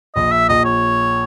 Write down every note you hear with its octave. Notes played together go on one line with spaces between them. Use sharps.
A#1 D#5
E5
A#1 D#5
C#5